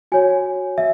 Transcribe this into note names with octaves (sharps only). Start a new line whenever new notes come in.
F#4 C#5 G#5
E5